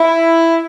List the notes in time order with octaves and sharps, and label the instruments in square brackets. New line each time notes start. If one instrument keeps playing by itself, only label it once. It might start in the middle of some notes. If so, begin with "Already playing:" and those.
Already playing: [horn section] E4